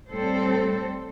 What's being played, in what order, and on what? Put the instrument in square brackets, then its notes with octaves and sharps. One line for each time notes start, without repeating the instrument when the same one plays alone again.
[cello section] A2 G3 C4 A4 C5